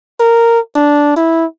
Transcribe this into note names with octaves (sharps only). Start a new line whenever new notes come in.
A#4
D4
E4